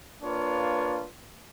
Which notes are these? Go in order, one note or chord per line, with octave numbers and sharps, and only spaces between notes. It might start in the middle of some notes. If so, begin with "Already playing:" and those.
A#3 D4 F4 B4 C#5